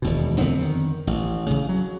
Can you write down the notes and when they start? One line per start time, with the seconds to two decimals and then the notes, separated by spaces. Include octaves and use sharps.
0.02 E1 D#2 B2
0.39 F2 D3 B3 C4
0.62 D#3
1.07 A1
1.50 C#3
1.69 F#3